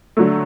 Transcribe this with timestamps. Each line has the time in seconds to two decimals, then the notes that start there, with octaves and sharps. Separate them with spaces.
0.17 D3 F#3 A3